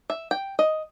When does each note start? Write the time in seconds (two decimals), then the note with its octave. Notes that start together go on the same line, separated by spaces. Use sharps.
0.10 E5
0.31 G5
0.59 D#5